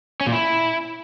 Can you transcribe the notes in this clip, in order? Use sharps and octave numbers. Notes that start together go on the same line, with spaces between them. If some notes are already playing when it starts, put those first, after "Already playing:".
C#4
A#2
E4